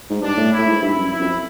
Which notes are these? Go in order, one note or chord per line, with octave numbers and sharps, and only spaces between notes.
G#2
G2 D4
A2
E4
A2
G#2
G2 E4
F#2
F#2 E4
F2